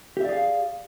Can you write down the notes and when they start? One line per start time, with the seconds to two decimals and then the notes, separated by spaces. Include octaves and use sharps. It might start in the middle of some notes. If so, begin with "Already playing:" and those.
0.17 G4
0.21 E5
0.25 D5
0.29 G#4
0.33 F5